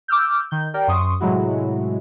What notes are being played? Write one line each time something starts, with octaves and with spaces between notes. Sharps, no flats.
D6 E6 F6 G6
D#3 G6
G4 A#4 D5 G5
F#2 C6 C#6 D#6
A2 C3 F#3 G#3 E4 F#4